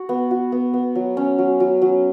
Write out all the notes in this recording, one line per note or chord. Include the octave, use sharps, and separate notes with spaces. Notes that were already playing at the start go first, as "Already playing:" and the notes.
Already playing: F#4
B3
F#4
B3
B3
F#3
C#4
F#3
F#3
F#3